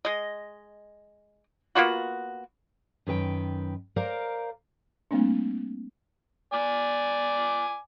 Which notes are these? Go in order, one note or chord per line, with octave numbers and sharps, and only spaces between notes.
G#3 D#5
A#3 B3 F4 F#4
F#2 D#3 B4 G5
A#4 C5 D5 F5 A#5
G3 A3 A#3 C4 D4
D5 G#5 D6